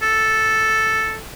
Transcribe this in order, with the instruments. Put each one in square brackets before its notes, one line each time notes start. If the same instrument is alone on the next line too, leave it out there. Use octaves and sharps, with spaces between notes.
[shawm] A4